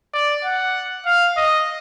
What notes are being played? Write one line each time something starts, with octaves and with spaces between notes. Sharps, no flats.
D5
F#5
F5
D#5